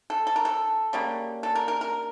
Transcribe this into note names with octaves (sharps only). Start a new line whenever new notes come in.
A4
A4
A#4
A4
C#3 G3 A#3
A4
A#4
A#4
A#4